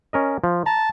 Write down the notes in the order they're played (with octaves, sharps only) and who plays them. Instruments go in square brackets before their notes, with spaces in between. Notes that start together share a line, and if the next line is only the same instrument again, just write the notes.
[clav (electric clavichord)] C#4 A#4 D#5
F3
[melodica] A5 [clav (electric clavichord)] A#5